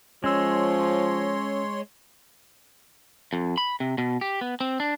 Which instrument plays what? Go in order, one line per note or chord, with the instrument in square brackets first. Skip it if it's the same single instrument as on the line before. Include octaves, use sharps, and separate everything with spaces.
[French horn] F3 [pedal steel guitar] G#3 [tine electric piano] C#4 E6 [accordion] C#5 C6
[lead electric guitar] F2
B5
C3
B2
G4
B3
C4
D4